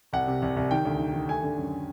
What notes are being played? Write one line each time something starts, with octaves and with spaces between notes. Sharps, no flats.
C2 F#5
C3
C2
C2
D#3 G5
D2
D#3
D#3
A3 G#5
D3
F#2